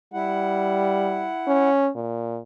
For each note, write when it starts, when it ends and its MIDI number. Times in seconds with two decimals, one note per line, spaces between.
0.14 1.30 55
0.14 1.69 64
0.14 1.69 78
1.47 1.90 61
1.96 2.39 46